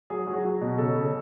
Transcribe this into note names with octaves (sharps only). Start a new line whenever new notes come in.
F#3 G#4
F#3
F#4
F#3
B2
C#3 A4
C#3